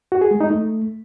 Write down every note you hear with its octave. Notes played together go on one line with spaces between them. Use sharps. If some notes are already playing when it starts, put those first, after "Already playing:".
F#4
G#4
G#3
D#4
A3